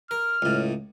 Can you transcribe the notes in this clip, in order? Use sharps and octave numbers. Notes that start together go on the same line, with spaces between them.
A#4 F6
C#2 A2